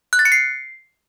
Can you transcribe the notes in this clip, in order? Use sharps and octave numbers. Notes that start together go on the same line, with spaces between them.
F#6
A6
C#7
C7